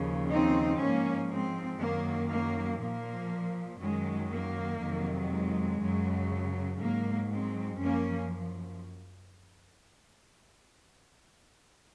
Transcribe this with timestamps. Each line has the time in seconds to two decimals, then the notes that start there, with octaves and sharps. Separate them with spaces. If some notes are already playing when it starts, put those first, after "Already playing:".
Already playing: D#2 C#3 F3
0.31 C4 D#4
0.80 G#2 F3 A#3 C#4
1.31 G#3 C4
1.80 F#2 D#3 F#3 A#3
2.31 A#3
2.80 A#2 F3 A#3
3.80 F#2 D#3 F#3 G#3
4.31 A#3
4.81 F2 C3 D#3 F#3
5.30 G#3
5.81 F#2 C#3 F#3
6.80 G#2 F#3 A#3
7.31 G#3 C4
7.81 F#2 F3 A#3 C#4